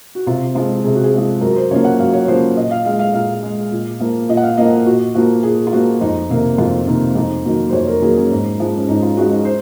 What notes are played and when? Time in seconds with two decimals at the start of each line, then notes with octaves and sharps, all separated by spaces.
0.15 F#4
0.27 C3 F4
0.55 F3 G#3 F4
0.84 C3 G#4
0.95 F#4
1.04 G#4
1.13 G#3
1.18 F3
1.41 F#2 A#4
1.56 C5
1.71 C#3 F3 A#3 C#5
1.84 F#5
1.99 F#2 F5
2.13 C#5
2.28 C#3 F3 A#3 C5
2.56 A#2 D#5
2.71 F5
2.85 G#3 F5
2.99 F5
3.14 A#2 F5
3.42 G#3
3.72 A#2
4.00 F3 A#3
4.29 A#2 D#5
4.37 F#5
4.43 F5
4.57 F3 A#3 D#5
4.86 A#2 F#4
5.14 F3 A#3 F#4
5.43 A#2 G#4
5.67 F4
5.73 F3 A#3 F#4
6.01 F2 D#4
6.30 C3 D#3 A#3
6.58 F2 F4
6.87 C3 D#3 A#3
7.15 F2 D#4
7.45 D#3 F#3 A#3
7.69 C5
7.73 F2 C#5
7.87 A#4
8.02 D#3 F#3 A#3 G#4
8.17 C#4
8.30 G#2 D#4
8.60 F3 G#3
8.77 C#4
8.88 G#2 D#4
9.03 F4
9.17 F3 G#3 F#4
9.31 D#4
9.45 C5